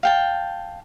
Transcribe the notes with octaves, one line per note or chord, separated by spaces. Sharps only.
F5 G5 A5